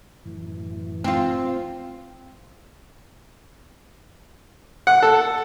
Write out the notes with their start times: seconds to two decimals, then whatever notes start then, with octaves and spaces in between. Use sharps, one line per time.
0.25 F#2 A2 E3
1.04 C4 F4
4.87 F#5
5.02 A4